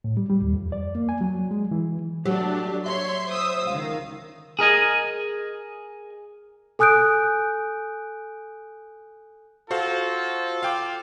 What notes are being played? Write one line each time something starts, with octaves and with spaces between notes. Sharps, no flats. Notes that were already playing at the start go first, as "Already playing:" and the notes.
A2
G3
G3
D#2
F2
D5
A#3
G#5
F#3
G#3
E3
F#3 A3 D4 G4
C#5 E5 C6
C5 D#6 E6
C#2 D#3 F5
G#4 A#4 D#5 G#5
A4 G#5 D#6 F#6 G6 D7
F4 F#4 A4 C5 F5
F5 G5 D6